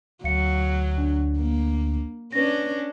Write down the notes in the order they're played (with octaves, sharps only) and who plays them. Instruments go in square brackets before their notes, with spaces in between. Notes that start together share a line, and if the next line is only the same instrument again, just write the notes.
[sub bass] D2 [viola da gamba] F#3 [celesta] F5 C#7
[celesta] D4
[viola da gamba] A#3
[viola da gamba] C#4 D4 [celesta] B4 A#6